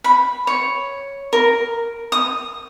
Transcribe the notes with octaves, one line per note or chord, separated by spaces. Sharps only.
B5
C#5
A#4
D#6